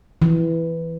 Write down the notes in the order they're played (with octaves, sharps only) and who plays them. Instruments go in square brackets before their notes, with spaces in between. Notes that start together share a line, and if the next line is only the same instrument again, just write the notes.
[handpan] E3